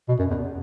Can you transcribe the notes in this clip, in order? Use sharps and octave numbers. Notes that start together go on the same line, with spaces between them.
B2
F#2
E2